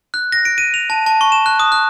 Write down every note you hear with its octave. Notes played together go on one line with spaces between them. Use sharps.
F#6
A#6
D7
D#7
F7
A5
A5
C#6
E7
F#6
D#6
F#6